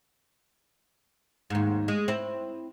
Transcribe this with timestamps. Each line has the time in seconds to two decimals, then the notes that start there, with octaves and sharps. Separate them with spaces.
1.50 D#2 G#2
1.88 G#3
2.08 C4 E4